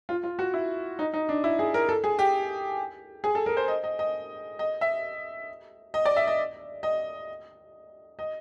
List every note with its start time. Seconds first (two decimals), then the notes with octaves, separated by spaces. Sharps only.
0.09 F4
0.24 F4
0.39 F#4
0.54 E4
0.99 D#4
1.14 D#4
1.29 D4
1.44 E4
1.59 G#4
1.74 A#4
1.89 A4
2.04 G#4
2.19 G4
3.24 G#4
3.35 A4
3.46 A#4
3.57 C5
3.68 D#5
3.84 D#5
3.99 D#5
4.59 D#5
4.81 E5
5.94 D#5
6.06 D5
6.16 E5
6.27 D#5
6.83 D#5
8.19 D#5